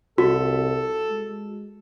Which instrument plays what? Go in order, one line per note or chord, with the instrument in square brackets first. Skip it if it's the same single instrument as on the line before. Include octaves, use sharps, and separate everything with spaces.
[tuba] C2 [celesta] F#4 [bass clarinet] A4
[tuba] G#3